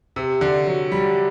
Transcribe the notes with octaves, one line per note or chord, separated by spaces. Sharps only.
C3
D3
F#3
G3